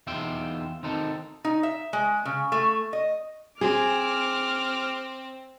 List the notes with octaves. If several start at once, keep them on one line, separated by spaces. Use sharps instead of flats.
E2 E3 D#4 F4 E5 G5
D#3 C4 D#4 A4
D#4
E5
G#3
C#3
A3
D#5
C4 G#4 D6 F6